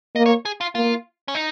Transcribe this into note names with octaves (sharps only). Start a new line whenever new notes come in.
A#3 D#5
C#5
G#4
F4
A#3 F4
C#4
D#4